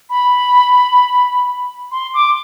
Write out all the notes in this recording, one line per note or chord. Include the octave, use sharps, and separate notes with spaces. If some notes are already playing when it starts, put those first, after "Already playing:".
B5
C6
D6